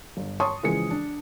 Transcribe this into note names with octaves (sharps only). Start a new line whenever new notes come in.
G1
C#5 A5 C6 C#6 D#6
C#3 E3 F3 G#3 G#4 C#7
D4